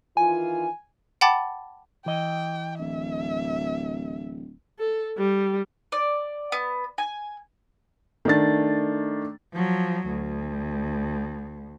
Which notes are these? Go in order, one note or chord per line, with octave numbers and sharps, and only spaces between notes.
D#3 E3 F4 G#5
F#5 G5 A5 B5 D6 A6
E3 D#5 G5
D1 E5
A4
G3
D5
B3
G#5
D#3 A3 D4 A6
F3 F#3
D2